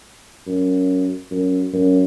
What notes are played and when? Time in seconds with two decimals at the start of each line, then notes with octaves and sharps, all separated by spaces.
0.47 F#2
1.31 F#2
1.73 F#2